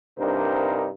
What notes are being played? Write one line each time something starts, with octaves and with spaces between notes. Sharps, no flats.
C2 G2 D4 D#4 A#4 C5